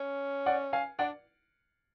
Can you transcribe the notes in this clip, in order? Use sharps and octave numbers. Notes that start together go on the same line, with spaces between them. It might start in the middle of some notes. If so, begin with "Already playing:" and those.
Already playing: C#4
D5 F#5
F5 G#5
D4 D5 F#5